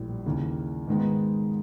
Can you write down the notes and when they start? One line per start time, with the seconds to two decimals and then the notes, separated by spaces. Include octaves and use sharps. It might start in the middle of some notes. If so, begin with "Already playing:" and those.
Already playing: A#1 A2 E3 G3
0.26 D#2 C#3 E3
0.87 G#2 D#3 G#3 B3